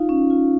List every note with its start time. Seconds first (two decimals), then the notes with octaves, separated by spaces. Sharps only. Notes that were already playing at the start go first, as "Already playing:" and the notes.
Already playing: D#4 F4 F5
0.09 C#4
0.30 F4